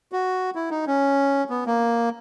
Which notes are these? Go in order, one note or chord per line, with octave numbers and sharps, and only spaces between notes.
F#4
E4
D#4
C#4
B3
A#3